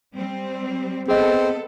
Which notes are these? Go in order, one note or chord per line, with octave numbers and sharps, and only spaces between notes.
G3 C4
B3 C4 G#4 A4 D#5